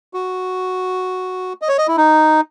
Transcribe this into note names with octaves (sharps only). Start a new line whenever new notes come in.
F#4
D#5
C#5
D#5
E4
D#4